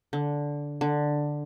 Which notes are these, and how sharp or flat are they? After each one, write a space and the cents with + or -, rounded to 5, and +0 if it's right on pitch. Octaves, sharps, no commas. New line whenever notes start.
D3 -10
D3 +5